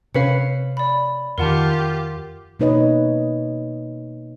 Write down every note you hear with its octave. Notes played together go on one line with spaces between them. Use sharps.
C3 C4 C#4 B4 F5 B6 C#7
D5 B5
F2 D#3 F4 G4 A#4 F#5 A5
B2 A#3 D#4 B4 C#5 D#5